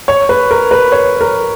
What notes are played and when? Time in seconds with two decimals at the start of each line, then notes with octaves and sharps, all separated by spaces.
0.08 C#5
0.29 B4
0.51 A#4
0.71 B4
0.92 C#5
1.21 A#4